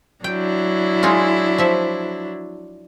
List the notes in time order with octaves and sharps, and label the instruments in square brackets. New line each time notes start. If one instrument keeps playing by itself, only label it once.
[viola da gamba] F#3 D4 E4 [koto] G5
[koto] G#3 D#4 F4
F3 E5